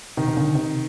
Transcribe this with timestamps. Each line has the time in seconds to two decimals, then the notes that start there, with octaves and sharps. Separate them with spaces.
0.17 C3 D#3 D#4
0.28 C3
0.37 D3
0.55 C3